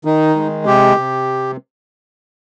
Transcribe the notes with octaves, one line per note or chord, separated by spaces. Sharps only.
D#3 D#4
G#3
C3 G4
C3